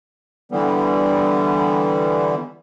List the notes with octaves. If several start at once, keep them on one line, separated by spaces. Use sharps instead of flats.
D3 E3 G3 B3